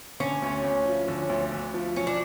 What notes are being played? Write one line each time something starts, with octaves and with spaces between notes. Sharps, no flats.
D3 C#4
D2
D2
F3
D3
D2
D2
F3
F#3 C#4
D4